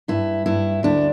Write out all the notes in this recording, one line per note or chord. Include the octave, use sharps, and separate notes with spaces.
G2 E4
G2 E4
D2 D4